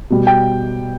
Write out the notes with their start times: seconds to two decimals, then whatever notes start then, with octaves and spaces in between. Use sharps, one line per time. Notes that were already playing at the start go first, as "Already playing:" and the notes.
0.10 B2 G3
0.27 G5